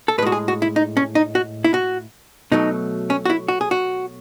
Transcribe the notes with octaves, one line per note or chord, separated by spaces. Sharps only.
A4
A2 G#3 F#4 B4
G#4
F#4
E4
D#4
C#4
D#4
F#4
E4
F#4
B2 F#3 A3 D#4
C#4
F#4
E4
F#4
G#4
F#4